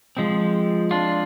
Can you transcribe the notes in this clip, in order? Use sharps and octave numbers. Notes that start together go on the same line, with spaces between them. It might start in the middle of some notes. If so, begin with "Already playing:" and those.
F3 G#3 C4
D4 F4